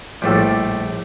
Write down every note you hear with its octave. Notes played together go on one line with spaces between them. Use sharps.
A#1 A2 G3 F4 A4